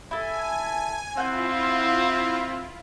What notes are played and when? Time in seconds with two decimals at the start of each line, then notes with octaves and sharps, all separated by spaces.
0.11 E4 A4 G#5
1.17 C4 E4 F4 F#5 G6